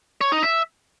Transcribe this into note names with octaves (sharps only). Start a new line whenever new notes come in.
C#5
D#4
E5